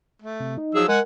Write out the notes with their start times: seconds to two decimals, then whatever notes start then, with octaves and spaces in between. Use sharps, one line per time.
0.22 A3
0.40 C3
0.58 D#4
0.75 F3 F#3 G#4 E6
0.88 G#3 A#4 F#5 G#5